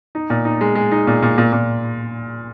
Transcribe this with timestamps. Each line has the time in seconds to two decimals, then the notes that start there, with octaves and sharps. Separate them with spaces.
0.15 D#4
0.30 A#2
0.45 D#4
0.61 G#3
0.75 G#3
0.92 D#4
1.07 A#2
1.22 A#2
1.38 A#2
1.53 A#2